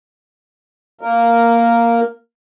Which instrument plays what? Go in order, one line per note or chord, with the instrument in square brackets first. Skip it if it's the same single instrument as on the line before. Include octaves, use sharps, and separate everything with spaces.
[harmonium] A#3 A#4